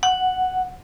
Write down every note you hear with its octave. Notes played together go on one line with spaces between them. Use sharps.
F#5